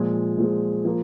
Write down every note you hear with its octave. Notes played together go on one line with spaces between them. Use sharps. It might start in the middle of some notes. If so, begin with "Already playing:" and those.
Already playing: A#2 F3 G#3
A#2 F3 G#3
F3 A#3